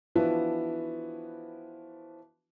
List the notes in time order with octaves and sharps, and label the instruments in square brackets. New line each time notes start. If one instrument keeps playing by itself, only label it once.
[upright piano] E3 F3 B3 D4 E4 F#4